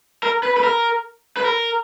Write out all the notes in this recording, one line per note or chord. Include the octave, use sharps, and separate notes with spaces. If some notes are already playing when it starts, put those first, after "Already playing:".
A#4
B4
B4
A#4
B4
A#4